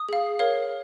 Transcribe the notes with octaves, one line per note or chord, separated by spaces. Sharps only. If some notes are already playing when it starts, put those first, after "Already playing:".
Already playing: D#6
G#4 F5
A#4 C#5 F5